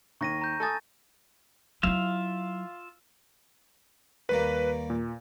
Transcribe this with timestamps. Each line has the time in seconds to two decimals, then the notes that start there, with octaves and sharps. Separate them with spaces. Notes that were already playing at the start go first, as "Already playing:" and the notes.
0.21 D#2 C#6 A#6 D#7
0.41 A#5 G6
0.60 A4 G#5 A5 D#6 A6
1.83 F#3 E4 F4 E5 F5
4.29 D#2 G3 A#3 B4
4.90 A#2